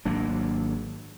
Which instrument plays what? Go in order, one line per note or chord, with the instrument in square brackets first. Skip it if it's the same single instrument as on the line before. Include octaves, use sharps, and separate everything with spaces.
[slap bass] G#1 F#3 A#3 D4